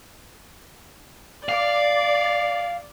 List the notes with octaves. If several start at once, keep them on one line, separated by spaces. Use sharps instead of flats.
D5 F5